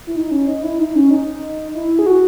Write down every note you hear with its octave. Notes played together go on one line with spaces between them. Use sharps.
E4
D#4
C#4
D#4
E4
D#4
C#4
D#4
E4
G#4
F#4